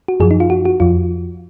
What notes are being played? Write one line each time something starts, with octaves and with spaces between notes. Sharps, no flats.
F#4
F#2 F3 G#4
D#4
F4
F#4
F#4
F2 F3 F4